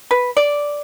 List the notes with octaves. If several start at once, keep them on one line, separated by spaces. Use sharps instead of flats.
B4
D5